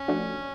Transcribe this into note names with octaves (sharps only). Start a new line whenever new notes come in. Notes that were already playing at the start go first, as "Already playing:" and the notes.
Already playing: C#4
F3 A3 D4 F#4